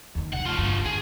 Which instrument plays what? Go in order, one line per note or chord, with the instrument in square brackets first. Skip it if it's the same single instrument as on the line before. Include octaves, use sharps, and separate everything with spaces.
[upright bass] E2 D#3
[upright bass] C3 D#3 [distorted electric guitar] F#5
[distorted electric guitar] A3 F4
[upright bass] D2 G2
[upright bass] G2 [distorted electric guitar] G#4